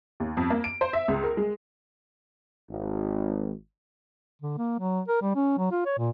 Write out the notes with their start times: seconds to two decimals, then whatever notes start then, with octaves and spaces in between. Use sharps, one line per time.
0.20 D#2
0.37 F2
0.50 A#3
0.64 D7
0.81 C5
0.93 E5
1.08 C#2
1.24 A#4
1.37 G#3
2.71 G#1
4.42 D3
4.58 A#3
4.79 F#3
5.08 A#4
5.22 G3
5.36 C#4
5.58 F#3
5.71 F4
5.86 C#5
5.98 A#2